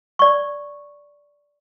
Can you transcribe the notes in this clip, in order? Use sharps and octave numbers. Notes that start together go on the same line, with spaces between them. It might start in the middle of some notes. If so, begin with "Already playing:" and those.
D5 C#6